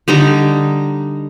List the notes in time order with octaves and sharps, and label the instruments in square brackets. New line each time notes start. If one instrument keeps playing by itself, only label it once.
[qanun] D3 G3 D#4 A#5